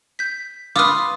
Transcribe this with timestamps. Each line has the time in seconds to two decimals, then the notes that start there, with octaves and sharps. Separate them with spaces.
0.19 G6 B6
0.76 F4 B4 D6 D#6 F6